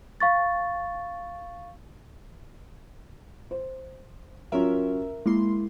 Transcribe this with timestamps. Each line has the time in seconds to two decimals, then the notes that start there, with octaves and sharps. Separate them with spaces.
0.20 F5 C#6 A6
3.51 C5
4.52 F#3 C#4 F4 A#4 E5
5.26 G#3 A#3 E4 C6